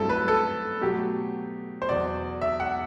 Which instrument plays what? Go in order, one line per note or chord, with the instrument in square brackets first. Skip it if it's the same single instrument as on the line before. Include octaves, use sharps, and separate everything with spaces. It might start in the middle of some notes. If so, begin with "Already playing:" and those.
Already playing: [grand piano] G2 F#3 A3 C4 E4 [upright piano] A4
[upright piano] B4
A4
[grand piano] B2 F#3 A3 [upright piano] G4
[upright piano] C5
[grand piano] E2 B2 F#3 [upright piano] D5
[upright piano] E5
F#5